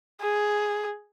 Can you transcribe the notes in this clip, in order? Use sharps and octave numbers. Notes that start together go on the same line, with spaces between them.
G#4